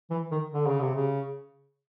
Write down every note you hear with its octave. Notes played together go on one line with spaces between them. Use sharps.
E3
D#3
D3
C#3
C3
C#3